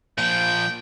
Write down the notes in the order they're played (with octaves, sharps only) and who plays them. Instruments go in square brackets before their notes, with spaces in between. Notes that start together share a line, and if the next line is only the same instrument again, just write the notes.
[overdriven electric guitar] A#2 F3 [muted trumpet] G5